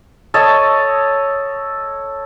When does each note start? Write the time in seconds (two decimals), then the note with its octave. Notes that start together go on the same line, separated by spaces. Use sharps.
0.34 A4 C#5 D#5 A5